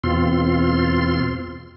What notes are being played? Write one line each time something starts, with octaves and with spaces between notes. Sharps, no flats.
E2 B2 C4 F4 C6